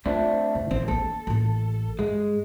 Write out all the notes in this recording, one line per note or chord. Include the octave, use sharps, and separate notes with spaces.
A3 C4 D4 F4
E1
A1 D#3 C4
A#3 D4 A4
A1 A#3
G2 G#3